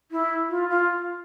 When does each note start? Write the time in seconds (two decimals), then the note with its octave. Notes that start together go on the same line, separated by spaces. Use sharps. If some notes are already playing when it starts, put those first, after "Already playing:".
0.12 E4
0.50 F4
0.69 F4